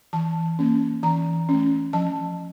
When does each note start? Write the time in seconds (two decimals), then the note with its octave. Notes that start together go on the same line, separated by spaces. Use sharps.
0.13 E3 A5
0.59 A#3 C#4
1.03 E3 A#5
1.49 A3 C#4
1.93 F3 A5